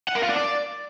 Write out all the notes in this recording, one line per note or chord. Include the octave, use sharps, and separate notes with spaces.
F#5
A#4
F4
D4
D5